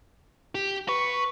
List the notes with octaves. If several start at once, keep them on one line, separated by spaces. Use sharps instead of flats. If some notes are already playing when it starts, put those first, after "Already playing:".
G4
B4 C#6